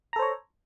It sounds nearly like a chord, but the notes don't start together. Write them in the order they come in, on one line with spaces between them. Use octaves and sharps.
A#5 A4 C5 C#5